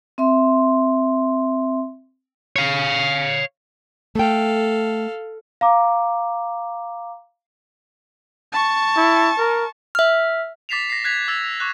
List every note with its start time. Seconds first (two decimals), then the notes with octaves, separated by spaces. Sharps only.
0.18 C4 E5 C6
2.56 C#5 F5
4.15 A3 A4 F5 G5
5.61 F5 A#5 D6
8.52 A5 C#6
8.97 E4
9.38 A#4
9.95 E5 F6
10.69 D6 A6 B6 C7 E7 F7
10.90 A#6 C7
11.04 F#6 G#6 B6 C7 F7
11.28 D6 E6 G#6 A6 B6 F7
11.44 F7
11.60 C#6 D6 F#6